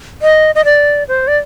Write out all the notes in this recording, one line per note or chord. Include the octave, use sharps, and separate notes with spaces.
D#5
D#5
D5
C5
D5